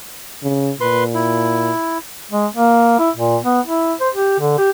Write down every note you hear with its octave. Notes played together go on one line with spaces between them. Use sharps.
C#3
A#2 B4 C6
E4
G#3
A#3
E4
A#2
B3
E4
C5
G4
D3
G4